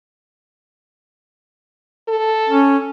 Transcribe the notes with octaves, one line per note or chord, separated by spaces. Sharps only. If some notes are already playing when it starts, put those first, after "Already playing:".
A4
C#4